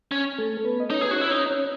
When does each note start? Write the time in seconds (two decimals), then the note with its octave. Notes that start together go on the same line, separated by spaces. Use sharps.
0.11 C#4
0.38 A3 A4
0.64 B3 B4
0.80 D#5
0.90 C#4 D#4 C#5
1.01 G#4 B4
1.10 C#4 F#4 C#5
1.21 E4
1.30 C#4 D#4 C#5
1.50 C#4 C#5